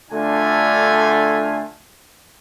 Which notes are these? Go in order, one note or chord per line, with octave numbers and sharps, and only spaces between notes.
D3 A3 D4 F4 G#5